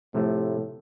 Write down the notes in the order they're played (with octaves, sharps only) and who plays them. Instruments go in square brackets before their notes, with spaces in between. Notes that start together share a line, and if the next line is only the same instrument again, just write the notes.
[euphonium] A2 [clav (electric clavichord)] C3 F3 A3